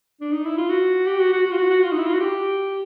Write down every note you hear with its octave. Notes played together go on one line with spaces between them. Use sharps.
D4
D#4
E4
F4
F#4
G4
F#4
F#4
F#4
F4
F#4
F#4
F4
D#4
E4
F4
F#4
G4